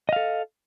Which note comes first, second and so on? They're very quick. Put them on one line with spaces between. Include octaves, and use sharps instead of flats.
D#5 F5 A4